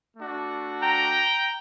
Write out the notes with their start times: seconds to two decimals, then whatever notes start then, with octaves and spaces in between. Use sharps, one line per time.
0.17 A3 D4 F#4
0.82 G5 A#5